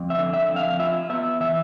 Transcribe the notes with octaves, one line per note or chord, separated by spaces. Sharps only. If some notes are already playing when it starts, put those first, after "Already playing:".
Already playing: F2
E5
D3
E5
F2
F5
F4 E5
B3 E5
E3 E5